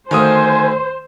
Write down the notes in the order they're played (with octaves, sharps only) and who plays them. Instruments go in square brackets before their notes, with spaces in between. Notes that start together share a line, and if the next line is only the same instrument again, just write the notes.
[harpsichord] D2 F5 [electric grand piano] D#3 D#6 [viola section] C5 [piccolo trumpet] G#5